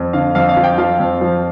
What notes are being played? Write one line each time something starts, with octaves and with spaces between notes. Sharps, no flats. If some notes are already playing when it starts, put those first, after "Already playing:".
Already playing: F2
D3 F5
F2 F5
F5
F3
G5
F3 F5
F2
F3